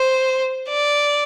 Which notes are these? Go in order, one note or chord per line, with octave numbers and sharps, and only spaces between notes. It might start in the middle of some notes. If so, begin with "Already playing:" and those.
Already playing: C5
D5